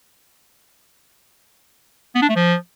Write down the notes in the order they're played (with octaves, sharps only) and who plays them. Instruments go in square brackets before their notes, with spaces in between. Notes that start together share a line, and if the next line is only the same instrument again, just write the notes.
[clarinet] B3
D4
A3
F3